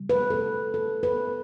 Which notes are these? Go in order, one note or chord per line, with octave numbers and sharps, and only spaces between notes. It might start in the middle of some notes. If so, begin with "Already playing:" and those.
Already playing: C3 G3
B4
A4
A4
B4